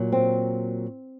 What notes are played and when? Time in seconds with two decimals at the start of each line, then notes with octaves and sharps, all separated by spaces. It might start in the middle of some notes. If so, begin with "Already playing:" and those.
Already playing: A#2 F#3
0.12 C4